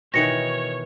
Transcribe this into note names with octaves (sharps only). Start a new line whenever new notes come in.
B2 D#3 E3 C#5 A#6 C#7